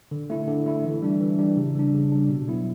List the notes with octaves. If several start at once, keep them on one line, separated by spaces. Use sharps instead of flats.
D3
A3 E4
D3
A3 E4
E3
G3 D4
E3
G3 D4
C#3
G3 D4
C#3
G3 D4
B2
F#3 B3 E4